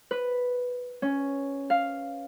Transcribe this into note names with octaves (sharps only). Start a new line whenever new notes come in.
B4
C#4
F5